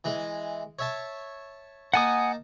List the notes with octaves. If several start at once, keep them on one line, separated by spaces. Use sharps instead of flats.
E3 G#3
C#5 E5 A5
A#3 D#4 F#5 G#5 A5 D#6